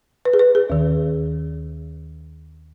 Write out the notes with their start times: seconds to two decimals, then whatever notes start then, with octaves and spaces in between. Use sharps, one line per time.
0.25 B4
0.33 G#4
0.39 B4
0.55 G#4
0.70 D#2 D#3